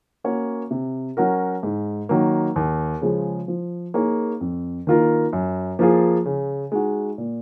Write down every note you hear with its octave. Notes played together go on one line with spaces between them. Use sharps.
A#3 C#4 F#4 C#5
C3
F#3 C#4 F#4 A#4
G#2
D#3 F#3 A#3
D#2
C#3 F3 G#3
F3
A#3 D#4 G#4 C#5
F2
D#3 A#3 F4 A#4
F#2
F3 A#3 F4 G#4
C#3
G#3 D#4 F#4
A#2